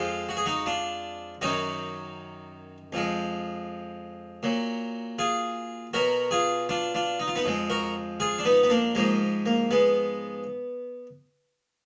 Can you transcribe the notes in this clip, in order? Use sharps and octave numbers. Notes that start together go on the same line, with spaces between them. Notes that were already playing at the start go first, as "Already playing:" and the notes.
Already playing: F2 F3 G#3 F4
F#4
G#4
D#4 F#4
D4 F4
F#2 D#3 F#3 D#4 F#4
F2 F3 G#3
A#2 F#3
F4 G#4
B2 F#3 F#4 A#4
F4 G#4
D4 F4
D4 F4
D#4
F4
B3 D#4
F2 F3 G#3
F#4 A#4
F4 G#4
D4
B3 D#4
B3
A#3 D4
G#2 F3 G#3 A#3
A#3
G#3 B3